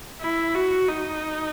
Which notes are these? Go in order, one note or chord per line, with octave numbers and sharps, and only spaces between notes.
E4
F#4
D#4